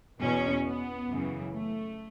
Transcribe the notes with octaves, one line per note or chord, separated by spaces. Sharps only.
E2 B2 C#4
B3
F#2 C#3 E3
A3